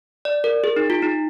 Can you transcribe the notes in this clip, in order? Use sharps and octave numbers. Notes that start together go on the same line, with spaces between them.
D5
A#4
G#4
D#4
F4
D#4